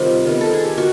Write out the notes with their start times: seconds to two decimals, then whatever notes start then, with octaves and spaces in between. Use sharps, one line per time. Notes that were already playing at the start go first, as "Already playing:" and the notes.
Already playing: C3 D#3 G3 F4 G4
0.26 D#3 G3 B3
0.41 A4
0.53 G#4
0.65 G4
0.78 D#3 F#4